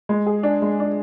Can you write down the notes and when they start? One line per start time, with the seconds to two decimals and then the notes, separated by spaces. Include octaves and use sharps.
0.09 G#3
0.26 G#4
0.43 D4
0.62 G#3
0.80 D4